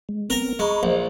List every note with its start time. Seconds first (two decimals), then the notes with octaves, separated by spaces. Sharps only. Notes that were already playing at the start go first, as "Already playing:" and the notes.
0.09 G#3
0.30 B3 C4 A#4 A#5
0.59 G#3 A#5 B5 C#6
0.83 A#1 C5 D#5